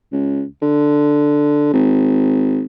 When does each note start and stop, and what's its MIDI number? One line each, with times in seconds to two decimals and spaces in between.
0.12 0.43 37
0.62 1.72 50
1.73 2.64 32